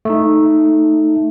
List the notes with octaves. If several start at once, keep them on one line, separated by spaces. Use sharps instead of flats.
A3 D#4